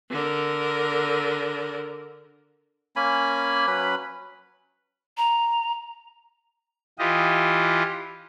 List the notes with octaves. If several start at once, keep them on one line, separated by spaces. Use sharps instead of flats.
D3 A#4
A#3 C#4 G#5 B5
F#3 C#4 B4 B5
A#5
E3 F4 G4 D#5